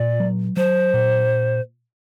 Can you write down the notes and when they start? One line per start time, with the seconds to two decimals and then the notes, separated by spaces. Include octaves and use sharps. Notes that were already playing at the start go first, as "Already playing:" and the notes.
Already playing: A#2 D5
0.20 F#3
0.57 F#3 C5
0.94 A#2